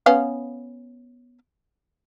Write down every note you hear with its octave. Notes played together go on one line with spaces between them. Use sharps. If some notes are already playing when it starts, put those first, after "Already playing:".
B3 C#4 F5